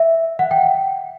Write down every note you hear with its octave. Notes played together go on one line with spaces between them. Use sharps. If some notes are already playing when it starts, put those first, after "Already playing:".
Already playing: E5
F#5
G5